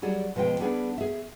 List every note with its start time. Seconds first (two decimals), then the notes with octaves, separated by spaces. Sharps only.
0.02 F#3 G3 G#4 D5
0.36 B2 F3 G#3 C#4 G5
0.60 G3 B3 D4 G#4
0.98 G#4 E5